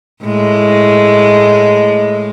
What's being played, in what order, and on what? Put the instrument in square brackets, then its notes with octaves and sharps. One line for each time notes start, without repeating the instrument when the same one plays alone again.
[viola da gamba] A2 G#3